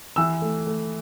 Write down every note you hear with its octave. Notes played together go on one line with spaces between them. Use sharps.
E3 E6
A3
A3